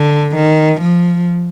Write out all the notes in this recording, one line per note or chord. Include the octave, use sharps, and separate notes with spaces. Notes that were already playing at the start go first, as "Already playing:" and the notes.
Already playing: D3
D#3
F3